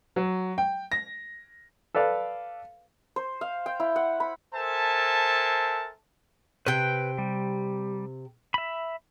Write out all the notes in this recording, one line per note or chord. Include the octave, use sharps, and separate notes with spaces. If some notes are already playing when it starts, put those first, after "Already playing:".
F#3
G5
A#6
A4 B4 D5 F5
C5
F5
G5
E4
F#5
B5
A4 A#4 C5 E5 G#5 A5
C3 B4 G5 F#6 G6
G3
E5 B5